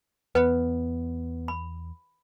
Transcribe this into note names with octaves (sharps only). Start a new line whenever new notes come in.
E2 B3 B4
B5